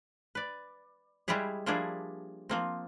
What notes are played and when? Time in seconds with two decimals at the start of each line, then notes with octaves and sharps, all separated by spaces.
0.35 B4 D5
1.28 G3 G#3 E4 G4 G#4
1.66 F3 G3 A#3 D4 E4 G#4
2.49 F3 A#3 C4